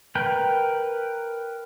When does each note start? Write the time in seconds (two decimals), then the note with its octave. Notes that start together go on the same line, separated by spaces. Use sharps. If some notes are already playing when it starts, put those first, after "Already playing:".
0.15 A#4 B4 G5